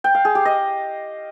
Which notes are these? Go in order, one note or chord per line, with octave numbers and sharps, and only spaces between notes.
G5
F5
G#4
G4
D#5